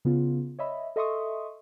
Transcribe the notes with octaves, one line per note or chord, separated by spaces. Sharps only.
C#3 B3 F4
C#5 D#5 E5 B5
A4 D#5 E5 C6 C#6 D#6